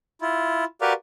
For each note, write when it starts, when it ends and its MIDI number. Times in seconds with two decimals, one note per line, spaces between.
0.21 0.65 64
0.21 0.65 65
0.81 0.93 66
0.81 0.93 67
0.81 0.93 70
0.81 0.93 71
0.81 0.93 74
0.81 0.93 77